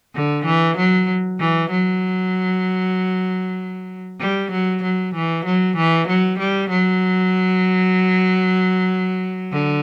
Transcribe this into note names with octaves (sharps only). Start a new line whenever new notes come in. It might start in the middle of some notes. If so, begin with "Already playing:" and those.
D3
E3
F#3
E3
F#3
G3
F#3
F#3
E3
F#3
E3
F#3
G3
F#3
D3